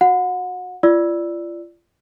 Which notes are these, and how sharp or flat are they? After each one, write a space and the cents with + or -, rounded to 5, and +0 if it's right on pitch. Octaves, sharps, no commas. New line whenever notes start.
F#4 -15 F#5 -30
F4 -35 D5 +0 E6 +0